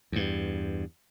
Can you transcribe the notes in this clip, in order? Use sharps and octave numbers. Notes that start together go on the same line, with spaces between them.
E2 G2